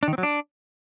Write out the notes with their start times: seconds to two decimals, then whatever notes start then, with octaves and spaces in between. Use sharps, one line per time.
0.03 D4
0.08 D#3
0.13 C4
0.18 F#3
0.23 D4